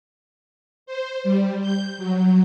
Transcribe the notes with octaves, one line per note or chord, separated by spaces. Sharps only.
C5
G3
G6
F#3